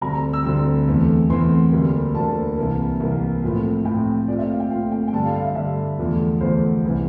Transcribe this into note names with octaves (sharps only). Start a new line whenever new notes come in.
D2 D3 G3 C4 A#5
E6
D2 D3 G3 C4
E2 E3 A3 C4
E2 E3 A3 C4 C6
D2 D3 G3 A#3
D2 D3 G3 A#3 A5
C2 C3 E3 A#3
C2 C3 E3 A#3
A2 F3 A3 C4
A2 F3 A3 C4 G5
A#2 A3 C4 D5
E5
F5
G5
A#2 A3 C4 F5
G5
G5
G2 D3 G3 A5
F5
F5
E5
G2 D3 G3 E5
E2 D3 F3 A3
E2 D3 F3 A3 C5
C2 C3 E3